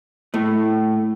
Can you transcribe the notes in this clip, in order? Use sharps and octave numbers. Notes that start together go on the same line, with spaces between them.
A2 A3